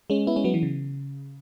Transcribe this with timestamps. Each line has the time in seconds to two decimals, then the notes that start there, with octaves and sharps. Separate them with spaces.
0.10 G#3 C#4
0.27 B3 E4
0.36 G#3 C#4
0.44 F#3 B3
0.54 E3
0.63 C#3